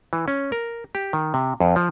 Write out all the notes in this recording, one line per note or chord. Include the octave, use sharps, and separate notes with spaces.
E3
C#4
A#4
G4
D#3
C3
F2
F3